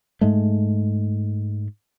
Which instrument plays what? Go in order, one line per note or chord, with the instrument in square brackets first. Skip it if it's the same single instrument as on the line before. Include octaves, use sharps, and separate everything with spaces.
[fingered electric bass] G#2 G#3 A3